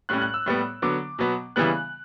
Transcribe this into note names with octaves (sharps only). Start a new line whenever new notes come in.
A2 G3 C#4 F#6
F#6
E6
A2 G3 B3
D3 F#3 B3 D6
B2 F#3 B3
C#3 E3 G3 B3 F#6